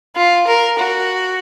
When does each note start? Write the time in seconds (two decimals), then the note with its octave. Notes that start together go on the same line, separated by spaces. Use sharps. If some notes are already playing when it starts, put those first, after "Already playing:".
0.16 F4
0.47 A#4
0.79 F#4